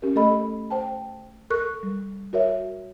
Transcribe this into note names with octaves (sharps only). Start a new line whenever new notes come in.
C#4 G4 A#4
A3 A4 D#5 B5
C5 G5 A5
A4 A#4 C#6 F#6
G3
F#4 A#4 C#5 E5